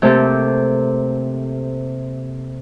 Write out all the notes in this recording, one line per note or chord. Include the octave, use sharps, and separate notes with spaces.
C3 A3 A#3 C4 G4 A4